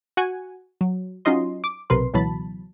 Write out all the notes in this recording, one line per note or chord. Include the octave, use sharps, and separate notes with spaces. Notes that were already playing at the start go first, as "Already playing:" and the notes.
F#4 F#5 G#5
F#3
F#3 C#4 D#4 F4 D#5 C6
D6
B1 C3 A#4 B4 C6
C#2 B2 E3 F#3 A5 B5